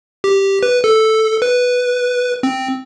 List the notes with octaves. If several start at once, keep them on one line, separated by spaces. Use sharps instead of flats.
G4
B4
A4
B4
C4